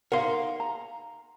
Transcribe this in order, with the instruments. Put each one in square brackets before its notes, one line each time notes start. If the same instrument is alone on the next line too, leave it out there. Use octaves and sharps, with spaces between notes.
[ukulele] D#4 F5 F#5 [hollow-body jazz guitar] A#4 C6
[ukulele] A#5